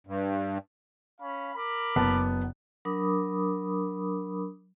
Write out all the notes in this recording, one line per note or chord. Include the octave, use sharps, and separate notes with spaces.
G2
C#4 F5 B5
A#4 B5 D6
F#1 B3 A5
F#3 D4 A#4 B5 D6 D#6